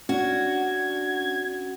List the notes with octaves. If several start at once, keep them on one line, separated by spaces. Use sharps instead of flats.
C#4 D4 F#4 G#6